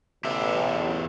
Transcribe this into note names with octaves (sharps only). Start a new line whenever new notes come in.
A1 E2 G4 E5